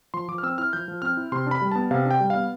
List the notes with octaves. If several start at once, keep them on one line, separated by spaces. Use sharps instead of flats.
F3 C6
F3 D6
F6
C4 E6
E4 F6
F3 G6
F3
C4 F6
E4
C3 C6
D4 B5
G3
B3 A5
C3 F5
D4
G5
G3
F5
B3